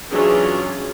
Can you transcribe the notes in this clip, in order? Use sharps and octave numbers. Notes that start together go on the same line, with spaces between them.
E3 F#3 C#4 D4 F4 G#4